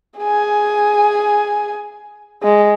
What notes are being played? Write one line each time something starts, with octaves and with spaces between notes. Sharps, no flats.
G#4 G#5
G#3